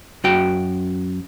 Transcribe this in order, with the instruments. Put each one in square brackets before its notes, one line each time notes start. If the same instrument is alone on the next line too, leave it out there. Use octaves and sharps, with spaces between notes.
[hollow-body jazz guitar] F#2 F#4 G5